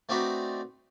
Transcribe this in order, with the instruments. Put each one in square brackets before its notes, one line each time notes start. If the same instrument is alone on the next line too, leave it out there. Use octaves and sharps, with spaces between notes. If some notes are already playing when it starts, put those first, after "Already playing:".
[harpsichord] A3 C4 D4 D#4 F#4 B4